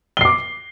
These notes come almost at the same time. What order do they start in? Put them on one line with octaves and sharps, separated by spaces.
G7 C7 D6